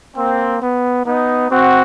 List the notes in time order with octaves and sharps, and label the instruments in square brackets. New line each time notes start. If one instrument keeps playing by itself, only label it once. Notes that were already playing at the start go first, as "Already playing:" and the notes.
[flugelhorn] A#3 [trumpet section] C4
[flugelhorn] B3
[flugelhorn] B3 [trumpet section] D#4
[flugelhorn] C4 [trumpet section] F#4